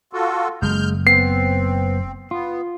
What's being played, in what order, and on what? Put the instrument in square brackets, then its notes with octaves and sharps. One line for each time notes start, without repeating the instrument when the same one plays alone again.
[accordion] F4 F#4 A4
[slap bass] F#1 [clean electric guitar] G#3 [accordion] F6 G6
[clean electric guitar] B3 [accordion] C4 [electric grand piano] C7
[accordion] B3 [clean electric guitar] F4